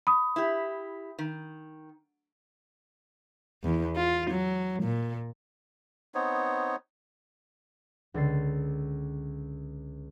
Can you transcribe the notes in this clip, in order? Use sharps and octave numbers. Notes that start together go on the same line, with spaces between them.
B5 D#6
E4 G4
D#3
E2
F4
F#3
A#2
B3 C4 D#4 C#5
C#2 D3 A6 C7